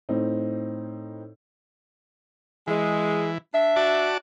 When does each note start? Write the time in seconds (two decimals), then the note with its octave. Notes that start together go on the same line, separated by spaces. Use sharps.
0.09 A2 C4 D#4
2.67 E3 G#3
3.53 D4 E5
3.76 F#4 D5 A5